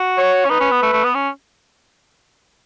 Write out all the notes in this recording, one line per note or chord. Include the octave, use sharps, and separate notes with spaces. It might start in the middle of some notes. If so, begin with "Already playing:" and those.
Already playing: F#4
C#5
C#4
D#4 B4
C#4
B3
A3
A3
B3
C#4